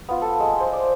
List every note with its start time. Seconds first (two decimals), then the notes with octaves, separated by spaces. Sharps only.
0.09 B3 F4
0.22 A4
0.40 G#3 C6
0.60 C5
0.73 D5